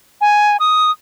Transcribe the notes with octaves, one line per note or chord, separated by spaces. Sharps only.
G#5
D#6